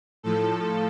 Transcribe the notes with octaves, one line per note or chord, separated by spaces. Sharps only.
A2 F3 A4